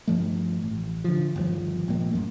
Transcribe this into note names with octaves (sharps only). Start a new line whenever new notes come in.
G2 F3 A3
A1
D3 F3
G1 D#2 F3
A#1 F3 A3 A#3
A1 F#2